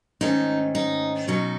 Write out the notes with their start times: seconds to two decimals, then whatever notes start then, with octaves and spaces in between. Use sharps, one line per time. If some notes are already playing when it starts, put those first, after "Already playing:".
0.21 G#2 D#3 A3 C#4 D#4
0.75 D#4
1.27 B2 F#3 C#4 D#4